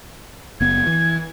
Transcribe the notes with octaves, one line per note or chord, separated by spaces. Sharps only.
F#1 B3 G#6
E3